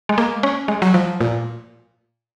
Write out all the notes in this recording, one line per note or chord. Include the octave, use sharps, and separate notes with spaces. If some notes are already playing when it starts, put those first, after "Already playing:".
G#3
A#3
C#4
G#3
F#3
F3
A#2